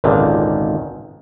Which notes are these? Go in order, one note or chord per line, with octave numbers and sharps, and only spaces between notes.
G#1 C#2 A#2 D3 D#3